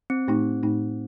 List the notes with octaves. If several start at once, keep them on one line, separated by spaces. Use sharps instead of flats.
C4
A2 A3 D#4
A2 A3 D#4